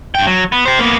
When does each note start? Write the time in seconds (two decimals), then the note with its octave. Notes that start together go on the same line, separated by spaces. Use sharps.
0.15 G2 G5
0.27 F#3
0.52 B3
0.65 G4 C5
0.79 A#3 B3